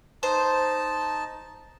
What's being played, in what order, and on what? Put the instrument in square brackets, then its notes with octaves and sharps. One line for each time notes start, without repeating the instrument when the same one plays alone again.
[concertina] D#4 A5 [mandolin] C5